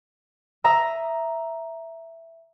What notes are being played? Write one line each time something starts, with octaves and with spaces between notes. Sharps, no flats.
E5 A#5 D#6